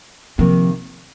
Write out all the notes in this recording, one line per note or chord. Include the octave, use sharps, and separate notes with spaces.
C3 D#3 F3 A#3